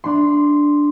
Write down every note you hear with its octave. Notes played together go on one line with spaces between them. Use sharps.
D4 C6